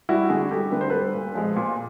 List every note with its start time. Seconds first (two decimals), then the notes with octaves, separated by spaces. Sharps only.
0.09 G3 E4 F#4
0.30 D3 F#4 G#4
0.51 G3 G4 A4
0.72 D3 B4
0.81 C5
0.90 G3 A4 B4
1.14 A#2
1.35 F3 G#3
1.56 A#2